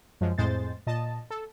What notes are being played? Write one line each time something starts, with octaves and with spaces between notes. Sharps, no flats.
F#2 F3 G#3
F2 A2 G#3 C5 A6
A#2 D#5 A5
A4